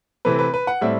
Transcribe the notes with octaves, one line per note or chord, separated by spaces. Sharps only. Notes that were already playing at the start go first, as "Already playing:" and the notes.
C3 E3 A3 C4 B4
B4
B4
F#5
A2 G3 C4 E5